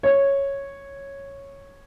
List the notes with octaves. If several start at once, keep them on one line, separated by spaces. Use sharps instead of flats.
C#5